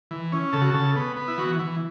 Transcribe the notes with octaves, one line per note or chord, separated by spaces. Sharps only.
E3
C#4
C#3 A4
F#4
C#3 A4
B3
B3
E4
E3 F#4
E3